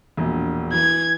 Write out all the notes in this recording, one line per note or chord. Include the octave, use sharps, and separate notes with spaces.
E1 A#1
E3 G#6